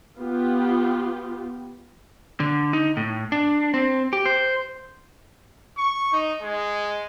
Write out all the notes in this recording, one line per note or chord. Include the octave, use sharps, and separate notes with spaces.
B3 F4 G4
D3
D#4
A2
D4
C4
G4
C5
C#6
D#4
G#3